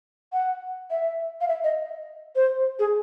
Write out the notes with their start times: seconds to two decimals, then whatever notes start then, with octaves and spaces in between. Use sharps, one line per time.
0.33 F#5
0.91 E5
1.41 F5
1.48 E5
1.64 D#5
2.36 C5
2.79 G#4